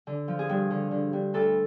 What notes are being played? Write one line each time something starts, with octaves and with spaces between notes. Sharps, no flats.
D3
F3
G#4
G2
D3
D3
G2
D2 A4